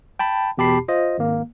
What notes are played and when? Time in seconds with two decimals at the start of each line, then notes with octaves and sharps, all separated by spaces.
0.19 G5 A5 B5
0.58 E2 B2 G4 A5 B5 C7
0.88 F4 C5 D#5
1.18 G#1 A#3